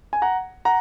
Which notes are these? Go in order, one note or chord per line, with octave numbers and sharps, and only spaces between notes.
G#5
F#5 A#5
F#5 A#5